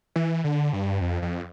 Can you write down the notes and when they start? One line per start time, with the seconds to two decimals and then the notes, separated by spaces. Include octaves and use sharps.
0.16 E3
0.44 D3
0.73 G2
1.01 F2
1.22 F2